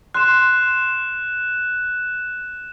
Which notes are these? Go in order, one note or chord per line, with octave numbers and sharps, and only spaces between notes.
C6 F#6 E7